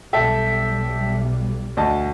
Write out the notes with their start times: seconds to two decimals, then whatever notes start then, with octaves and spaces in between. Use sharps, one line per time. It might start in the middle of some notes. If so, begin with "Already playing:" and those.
0.13 B1 G3 A4 E5 G5
1.77 D2 D#5 A5